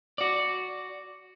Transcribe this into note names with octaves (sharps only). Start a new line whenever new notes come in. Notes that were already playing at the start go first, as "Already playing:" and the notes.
F#4 D5